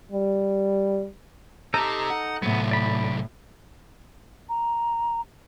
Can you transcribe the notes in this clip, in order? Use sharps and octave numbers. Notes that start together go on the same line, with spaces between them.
G3
D#4 G4 A4 C5 A#5
F#5
A2 C3 F#3 B3
D5 B5
A#5